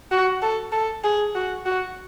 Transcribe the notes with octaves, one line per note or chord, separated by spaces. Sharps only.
F#4
A4
A4
G#4
F#4
F#4